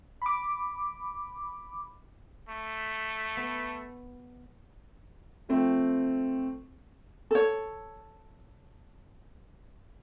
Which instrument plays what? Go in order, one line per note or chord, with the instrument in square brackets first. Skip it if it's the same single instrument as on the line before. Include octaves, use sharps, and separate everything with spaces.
[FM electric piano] B5 D6
[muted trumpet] A3
[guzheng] B3
[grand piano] F3 A3 C4
[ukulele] A4 C#5